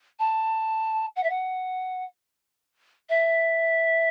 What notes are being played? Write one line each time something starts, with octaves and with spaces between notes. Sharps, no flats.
A5
F#5
E5
F#5
E5